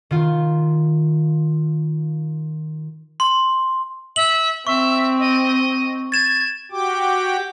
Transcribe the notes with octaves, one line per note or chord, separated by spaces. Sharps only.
D#3 F4
C6
E5 F#7
C4 E5 C#6
D#5
G#6 A6 E7
F#4 G4 G5 D6